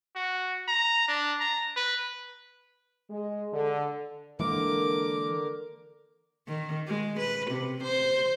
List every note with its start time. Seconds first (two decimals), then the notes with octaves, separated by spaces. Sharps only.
0.16 F#4
0.68 A#5
1.08 D4
1.40 A#5
1.77 B4
3.10 G#3
3.52 D3
4.40 D3 E3 G#3 A#3 A#4 D6
6.47 D#3
6.87 G#3
7.20 B4
7.51 C3
7.83 C5